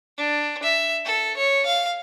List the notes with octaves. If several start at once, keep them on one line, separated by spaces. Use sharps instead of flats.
D4
E5
A4
C#5
F5